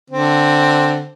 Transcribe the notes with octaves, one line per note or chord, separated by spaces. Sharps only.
D3 C4